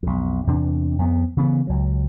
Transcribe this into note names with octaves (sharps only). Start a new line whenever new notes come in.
B1 F2
E2 C3 D4
F2 B3
C#3 E3 B3
C#2 F#3